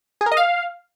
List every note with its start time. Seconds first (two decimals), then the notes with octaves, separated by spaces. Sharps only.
0.21 G#4
0.26 A#4
0.32 D#5
0.37 F5